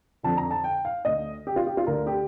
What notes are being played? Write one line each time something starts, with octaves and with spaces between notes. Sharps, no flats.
F2 D3 A5
A#5
A5
G5
F5
D2 D3 D#5
G4
F4
G4
F4
D2 D3 A#4
G4